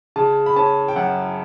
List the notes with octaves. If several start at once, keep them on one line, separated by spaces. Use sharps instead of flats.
C#3 A5
B5
C#4 A5
G5
F#2 F#5